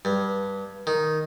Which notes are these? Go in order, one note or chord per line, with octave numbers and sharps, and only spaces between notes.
G2
D#3